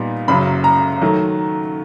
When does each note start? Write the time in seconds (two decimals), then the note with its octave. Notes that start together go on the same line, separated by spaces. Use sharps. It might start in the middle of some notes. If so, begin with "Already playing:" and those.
Already playing: A#2 G3 B3 D#4
0.28 F#1 F#2 C#3 F#3 B5
0.64 A#5
1.01 D#3 F#3 A3